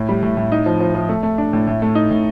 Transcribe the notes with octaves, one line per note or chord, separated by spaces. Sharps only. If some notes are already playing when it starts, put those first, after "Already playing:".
Already playing: A2
G3
A2
A2
D#4
F3
F3
F3
A3
A3
D4
A2
A2
A3
D#4
A2